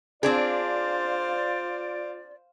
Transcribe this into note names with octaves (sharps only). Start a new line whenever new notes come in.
C4 D4 F4 G#4 C5 D5 F5